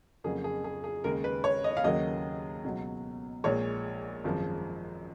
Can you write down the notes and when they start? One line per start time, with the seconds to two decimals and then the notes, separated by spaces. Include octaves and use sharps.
0.24 F2 C#3 F#3 A#3 G#4
0.44 G#4
0.64 G#4
0.84 G#4
1.04 D#2 C#3 G#3 A#4
1.24 B4
1.44 C#5
1.64 D#5
1.77 F5
1.84 D#2 C#3 F#3 A#3 D#5
2.64 C#2 B2 F#3
3.44 A#1 A#2 G#3 C#5
4.24 G#1 F#2 F3 G#3